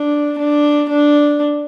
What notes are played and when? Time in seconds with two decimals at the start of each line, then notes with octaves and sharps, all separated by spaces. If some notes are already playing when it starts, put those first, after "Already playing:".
Already playing: D4
0.38 D4
0.89 D4